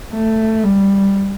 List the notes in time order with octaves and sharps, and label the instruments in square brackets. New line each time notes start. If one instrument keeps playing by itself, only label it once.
[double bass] A3
G3